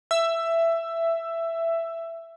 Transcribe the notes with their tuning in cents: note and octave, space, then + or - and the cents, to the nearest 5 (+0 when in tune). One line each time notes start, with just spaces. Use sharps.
E5 +10